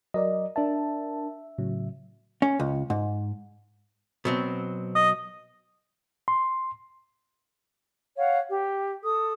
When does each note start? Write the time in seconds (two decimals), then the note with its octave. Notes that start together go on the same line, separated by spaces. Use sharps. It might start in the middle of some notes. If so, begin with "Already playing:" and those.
0.14 F#3 A#4 D5 D#5
0.56 D4 A#4 E5 A5
1.58 A2 C#3 F#3
2.42 C#4
2.60 C#2
2.90 G#2
4.25 B2 F#3 C4
4.95 D#5
6.28 C6
8.18 C#5 F5 F#5
8.49 G4
9.04 A4 D#6